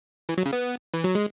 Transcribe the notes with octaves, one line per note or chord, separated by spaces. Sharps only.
E3
F#3
C#3
B3
E3
F#3
G#3